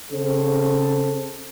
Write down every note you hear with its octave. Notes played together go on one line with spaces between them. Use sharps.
C#3 C4 A4 C5